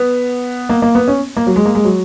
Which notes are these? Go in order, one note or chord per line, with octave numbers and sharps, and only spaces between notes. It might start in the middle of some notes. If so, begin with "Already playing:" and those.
Already playing: B3
A#3
A#3
B3
C#4
A#3
F#3
G#3
A#3
G#3
F#3